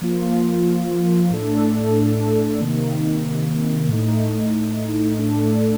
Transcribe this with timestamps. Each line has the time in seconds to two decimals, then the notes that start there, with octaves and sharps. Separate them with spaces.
0.02 F3 A#3 F4
1.30 A2 A3 D4 A4
2.60 C3 D#3 A#3
3.88 A2 A3 D#4
5.17 A2 A3 D4 A4